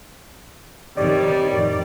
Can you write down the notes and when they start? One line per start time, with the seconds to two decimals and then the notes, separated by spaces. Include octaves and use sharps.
0.97 D#3 G3 C4 G4 C#5 D5
1.50 F2 A2 D#3